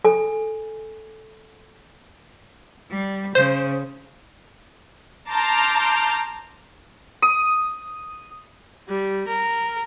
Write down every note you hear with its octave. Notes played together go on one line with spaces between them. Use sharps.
A4 G#5
G3
C#3 C5
A5 A#5 C6 D6 F6 G6
D#6
G3
A#4